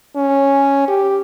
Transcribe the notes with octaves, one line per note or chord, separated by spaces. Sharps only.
C#4
G4